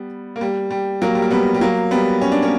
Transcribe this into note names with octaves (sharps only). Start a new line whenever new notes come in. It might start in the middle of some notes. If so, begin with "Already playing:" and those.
Already playing: G3 B3
A#3
G3
G3
F#3 A#3
G3
A#3
G3 B3
G3
F#3 A#3
G3 B3
C#4
D4
A#3 C#4